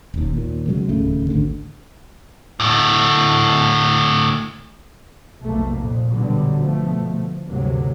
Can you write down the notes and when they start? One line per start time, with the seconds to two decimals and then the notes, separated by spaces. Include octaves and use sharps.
0.14 D#1 D#2
0.35 D#2 A#2
0.68 C#3 F#3 G#3
0.89 D1 D#2 C#3 A3
1.29 G#1 D2 D3
2.60 D2 A2
5.41 F1 B1 A3 A#3
5.79 F2 A#2
6.10 A#1 B2 D3 F#3 G3
6.60 G1 B2 F3 A3
7.46 D2 G2 C3 F#3 A#3